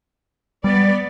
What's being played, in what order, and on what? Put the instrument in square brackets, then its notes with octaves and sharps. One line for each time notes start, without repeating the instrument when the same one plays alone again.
[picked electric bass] G3 [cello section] B3 D5